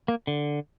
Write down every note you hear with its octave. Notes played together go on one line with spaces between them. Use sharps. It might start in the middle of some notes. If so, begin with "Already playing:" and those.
A#3
D3